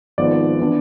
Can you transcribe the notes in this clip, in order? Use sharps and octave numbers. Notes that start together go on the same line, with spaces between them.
G#1 G#2 F3 B3 D5
E3 B3 D4